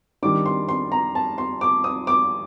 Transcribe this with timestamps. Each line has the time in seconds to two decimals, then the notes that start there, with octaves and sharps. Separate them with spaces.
0.22 D#3 G3 D4 D6
0.46 C6
0.69 C6
0.92 A#5
1.15 A5
1.38 C6
1.61 D6
1.84 D#6
2.07 D6